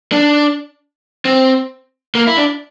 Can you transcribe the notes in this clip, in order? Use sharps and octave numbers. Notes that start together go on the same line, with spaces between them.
D4
C4
A#3
E4
D4